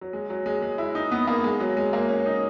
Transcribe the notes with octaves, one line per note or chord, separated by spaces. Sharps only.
F#3
G#3
F#3
G#3
G#3
E4
D#4
B3
A#3
G#3
F#3
G#3
A#3
C#4
D#4